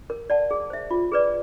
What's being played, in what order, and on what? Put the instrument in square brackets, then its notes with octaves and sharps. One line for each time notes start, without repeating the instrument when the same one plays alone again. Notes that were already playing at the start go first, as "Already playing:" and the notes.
[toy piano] A#4
D5 F#5 A5
G#4
C5 E5
F4
G#4 B4 D5